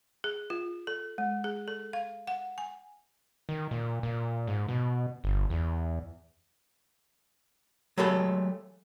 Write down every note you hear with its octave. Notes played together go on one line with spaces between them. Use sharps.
G#4
F4
A4
G#3
G#4
A4
F5
F#5
G#5
D#3
A#2
A#2
G#2
B2
G1
E2
F#3 G#3 A3 G4 A4 B5